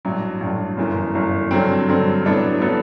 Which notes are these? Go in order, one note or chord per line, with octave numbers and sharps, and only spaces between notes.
A1 G2 F#3
A1 G2 F#3
G1 F#2 E3
G1 F#2 E3
G2 D3 F#3 C4
G2 D3 F#3 C4
A2 F#3 B3 D4 A4
A2 F#3 B3 D4 A4